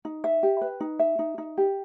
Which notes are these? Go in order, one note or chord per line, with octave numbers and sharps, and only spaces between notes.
D#4
E5
G4
B4
D#4
E5
D#4
D#4
G4